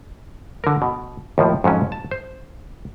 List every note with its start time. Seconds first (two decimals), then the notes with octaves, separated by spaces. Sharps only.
0.64 D3 A#4
0.82 B2
1.38 D#2 A2 F3
1.64 F2 G#2 F#3 C#4
1.92 A5
2.11 C5